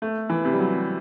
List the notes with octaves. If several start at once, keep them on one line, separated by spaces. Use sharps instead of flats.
A3
E3
C3
G3
F#3